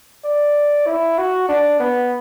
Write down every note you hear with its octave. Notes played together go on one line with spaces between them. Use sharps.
D5
E4
F#4
D4
B3